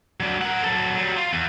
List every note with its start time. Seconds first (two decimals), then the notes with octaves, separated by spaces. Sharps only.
0.20 F#3 D4
0.42 A#4 F#5
0.64 F#3 A4
0.96 F#3 G3
1.16 F4
1.33 E2